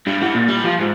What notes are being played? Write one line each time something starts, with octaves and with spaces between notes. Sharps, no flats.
G2 G3
E4 F#5
A#2
G3
F3 F4
G#2